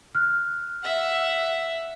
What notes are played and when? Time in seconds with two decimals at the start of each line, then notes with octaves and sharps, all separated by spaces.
0.15 F6 F#6
0.83 E5 F#5